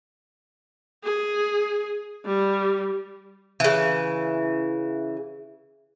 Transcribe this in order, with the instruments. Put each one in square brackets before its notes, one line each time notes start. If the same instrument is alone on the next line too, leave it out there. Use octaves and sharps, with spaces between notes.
[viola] G#4
G3
[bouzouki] C#3 E3